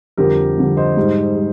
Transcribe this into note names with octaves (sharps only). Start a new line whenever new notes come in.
F2 D3 G3 G4 A#4
F2 D3 G3
C5 D#5
G#2 G3
G3